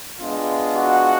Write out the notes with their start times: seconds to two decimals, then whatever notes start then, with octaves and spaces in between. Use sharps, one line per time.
0.19 G#3 B3 D4 F4
0.76 F#4 F#5